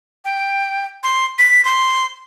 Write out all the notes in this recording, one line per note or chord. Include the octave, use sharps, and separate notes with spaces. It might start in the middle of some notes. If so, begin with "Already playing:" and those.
G5
C6
B6
C6